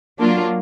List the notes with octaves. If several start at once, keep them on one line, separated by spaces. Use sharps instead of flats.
F#3 A#3 D4 F4